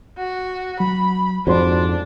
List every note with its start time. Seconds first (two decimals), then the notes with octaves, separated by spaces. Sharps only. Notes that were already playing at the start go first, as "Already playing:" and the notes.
0.18 F#4
0.80 F#3 B5
1.47 F2 G#2 D4 F#4 C5 C6